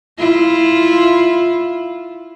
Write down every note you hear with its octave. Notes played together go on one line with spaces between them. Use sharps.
E4 F4